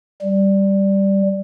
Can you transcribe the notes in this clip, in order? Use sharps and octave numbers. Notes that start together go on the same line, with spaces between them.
G3